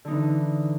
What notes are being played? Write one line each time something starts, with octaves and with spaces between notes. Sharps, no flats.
D3 E3 D#4